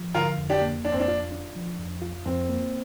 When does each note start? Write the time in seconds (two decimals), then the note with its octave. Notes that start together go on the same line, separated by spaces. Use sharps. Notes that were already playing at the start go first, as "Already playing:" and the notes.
Already playing: F3
0.14 D3 F4 A#4
0.38 F2
0.50 D4 G4
0.62 A#3
0.85 F2 D4
0.92 C4
1.00 D4
1.08 F4
1.32 D4
1.55 F3
1.78 F2
2.02 F4
2.25 F2 C4
2.49 A#3